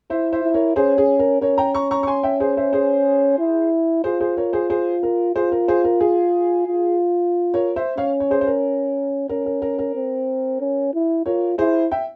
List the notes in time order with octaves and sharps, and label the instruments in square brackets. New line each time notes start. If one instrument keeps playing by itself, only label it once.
[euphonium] E4 [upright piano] C5 E5
[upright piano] C5 E5
[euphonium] E4
[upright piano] A#4 C#5
[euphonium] C#4 [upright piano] G#4 C5
[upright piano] G#4
A#4
[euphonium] C#4 [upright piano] A#4 C#5
[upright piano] G5 A#5
A#5 C#6
A#5 C#6
C#6
G#5 C6
E5 G5
G#4 C5
C5 E5
G#4 C5
[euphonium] E4
[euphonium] F4 [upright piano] G#4 C5
[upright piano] G#4 C5
A#4 C#5
G#4 C5
G#4 C5
A#4
[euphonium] F4 [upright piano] G#4 C5
[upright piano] A#4
G#4 C5
A#4
G#4
[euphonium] F4
[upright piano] A#4 C#5
C5 E5
[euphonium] C#4 [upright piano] C#5 F5
[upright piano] C#5
G#4 C5
C5
A#4
[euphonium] C#4 [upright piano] A#4
[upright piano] A#4
A#4
A#4
[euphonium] C4
C#4
E4
[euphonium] F4 [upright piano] A#4 C#5
[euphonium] E4 [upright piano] G#4 C5
[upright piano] E5 G5